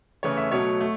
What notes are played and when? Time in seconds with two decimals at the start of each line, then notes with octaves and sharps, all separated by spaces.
0.23 C#3 E3 A3 C#5
0.37 E5
0.52 B2 F#3 A3 C#5
0.80 A3